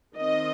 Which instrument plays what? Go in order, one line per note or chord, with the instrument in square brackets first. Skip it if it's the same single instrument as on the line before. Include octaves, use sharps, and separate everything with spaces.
[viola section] D#3 C4 D#5